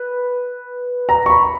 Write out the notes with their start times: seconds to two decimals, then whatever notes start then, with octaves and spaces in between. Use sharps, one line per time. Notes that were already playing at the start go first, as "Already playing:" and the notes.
Already playing: B4
1.09 A#5
1.26 C#6
1.30 B5